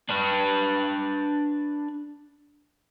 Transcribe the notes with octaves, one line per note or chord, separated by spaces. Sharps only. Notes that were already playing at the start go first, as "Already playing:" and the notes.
D4 B4